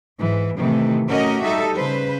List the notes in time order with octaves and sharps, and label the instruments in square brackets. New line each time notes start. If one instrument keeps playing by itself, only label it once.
[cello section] G#2 E3
A2 C3 D#3 E3 A3
A3 C#4 F#4 G4 A#4 D#5
G3 D#4 A4 E5
C#3 B4 C5